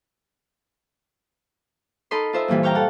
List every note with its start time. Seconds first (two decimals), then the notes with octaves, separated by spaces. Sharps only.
2.11 D#4 A4 A#4 D#5 B5 C6
2.33 F4 C5 E5
2.48 G2 A#2 E3 G3
2.63 C#5 F5 G5 A#5
2.75 A4 F#5